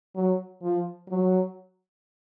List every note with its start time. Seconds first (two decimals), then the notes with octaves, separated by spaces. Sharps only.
0.15 F#3
0.62 F3
1.08 F#3